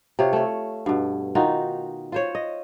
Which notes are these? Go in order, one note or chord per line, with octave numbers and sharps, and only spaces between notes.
C3 F4 C#5
A3 C#5
G2 B2
D#3 D#4 F4 F#4
F4 C5 C#5
D#5